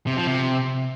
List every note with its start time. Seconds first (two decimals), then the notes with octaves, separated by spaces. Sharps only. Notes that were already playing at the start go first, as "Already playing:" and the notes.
0.07 C3
0.17 F3
0.27 C3